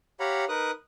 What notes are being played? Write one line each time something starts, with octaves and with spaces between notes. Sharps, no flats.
G4 C#5 F5 F#5 A#5 B5
D#4 A#4 B4 D#6 F#6